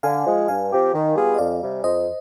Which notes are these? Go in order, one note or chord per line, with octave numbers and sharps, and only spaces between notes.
D3 F5 G#5
F3 G#3
G2 F5 G#5
F3 C4 G4
D#3
G3 B3 F4 G#4
D#5
F2 D5 F5
C3 G3
F2 C5 D#5